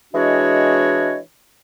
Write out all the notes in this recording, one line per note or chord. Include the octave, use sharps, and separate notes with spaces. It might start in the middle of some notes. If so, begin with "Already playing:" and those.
E3 G#3 D4 F#4 C#5 D#5